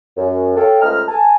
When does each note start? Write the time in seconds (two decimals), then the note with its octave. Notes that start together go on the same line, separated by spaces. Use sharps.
0.16 F#2
0.55 A4 C#5 F5 G5
0.81 C#2 A3 C5 D#5 A#5 F6
1.08 G#5 A5